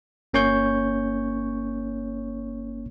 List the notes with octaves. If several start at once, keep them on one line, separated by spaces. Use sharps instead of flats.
G1 A#3 C#4 C#5 C#6 G6